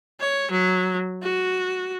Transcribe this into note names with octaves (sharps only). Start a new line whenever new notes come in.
C#5
F#3
F#4